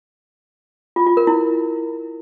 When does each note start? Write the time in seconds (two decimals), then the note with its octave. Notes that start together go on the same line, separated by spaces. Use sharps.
0.96 F4
1.07 F4
1.17 A#4
1.27 E4